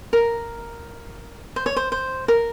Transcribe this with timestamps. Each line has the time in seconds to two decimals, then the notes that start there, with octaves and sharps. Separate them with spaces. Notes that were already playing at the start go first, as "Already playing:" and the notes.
0.13 A#4
1.56 C5
1.66 C#5
1.76 C5
1.92 C5
2.28 A#4